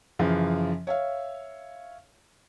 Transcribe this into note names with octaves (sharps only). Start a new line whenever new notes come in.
F#2 C#3 E3 F3
C#5 E5 F5